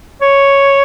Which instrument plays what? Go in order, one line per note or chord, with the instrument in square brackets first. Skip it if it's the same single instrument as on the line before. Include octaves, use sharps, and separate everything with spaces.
[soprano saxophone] C#5